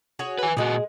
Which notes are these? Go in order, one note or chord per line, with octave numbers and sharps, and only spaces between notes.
F#4 G#4 C#5
B4 G#5
A#2 G#3 F#4 G#4